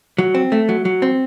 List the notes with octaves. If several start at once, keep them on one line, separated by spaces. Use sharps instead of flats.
F#3
C4
A3
F#3
F#3
C4